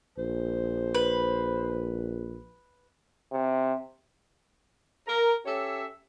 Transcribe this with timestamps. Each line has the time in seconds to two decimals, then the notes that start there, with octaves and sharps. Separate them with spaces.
0.18 A#1 C5
0.94 B4
3.32 C3
5.07 A#4
5.46 C#4 G4 A4 C#5 E5